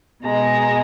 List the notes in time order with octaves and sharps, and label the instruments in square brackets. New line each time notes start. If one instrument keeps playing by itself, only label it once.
[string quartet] B2 G#3 A#5